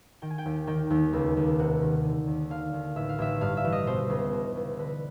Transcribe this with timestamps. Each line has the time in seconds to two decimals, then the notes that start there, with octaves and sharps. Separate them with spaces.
0.22 D#3 G5
0.30 G#5
0.38 G5
0.45 D#2
0.67 D#3 G5
0.90 D#2
1.13 C#2
1.37 C#2
1.59 C3 F#5
1.82 D#3
2.04 D3
2.27 D#2
2.50 D3 F5
2.73 D#2
2.96 A1 E5
3.09 F5
3.18 A1 E5
3.41 G2 F5
3.57 E5
3.64 E3
3.72 D#5
3.87 B2 C5
4.10 C#2
4.33 B2
4.56 C#2
4.78 D3 B4